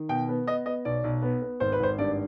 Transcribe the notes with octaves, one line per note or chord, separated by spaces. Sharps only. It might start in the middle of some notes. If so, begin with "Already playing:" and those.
Already playing: D#3
B2 G5
B3
B3 D#5
B3 D#5
B1 D5
B1
B3
B3
G#1 C5
B4
G#1 C5
G2 D5